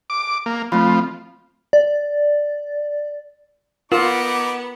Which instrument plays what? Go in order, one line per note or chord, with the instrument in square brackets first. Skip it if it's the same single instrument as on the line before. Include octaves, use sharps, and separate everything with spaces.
[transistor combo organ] D6
A#3
[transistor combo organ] F3 [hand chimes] A3 C4 B5
[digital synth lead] D5
[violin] B3 F#5 [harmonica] D#4 D6 [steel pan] F4 [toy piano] A#4